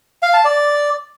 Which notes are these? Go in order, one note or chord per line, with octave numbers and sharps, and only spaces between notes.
F5
A5
D5